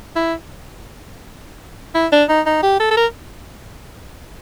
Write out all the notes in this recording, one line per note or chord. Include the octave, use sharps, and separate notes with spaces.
E4
E4
D4
D#4
D#4
G4
A4
A4
A#4